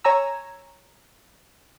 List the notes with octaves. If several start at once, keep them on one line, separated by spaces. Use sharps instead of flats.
C#5 G#5 A#5 E6